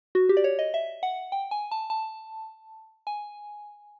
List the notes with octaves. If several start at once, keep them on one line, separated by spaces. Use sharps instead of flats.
F#4
G4
D5
C#5
D#5
E5
F#5
G5
G#5
A5
A5
G#5